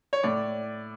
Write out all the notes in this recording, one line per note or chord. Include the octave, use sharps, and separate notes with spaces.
C#5
A2 D5